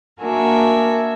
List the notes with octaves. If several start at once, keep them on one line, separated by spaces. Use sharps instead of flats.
A#3 D4 F#4 A#4 E5 G#5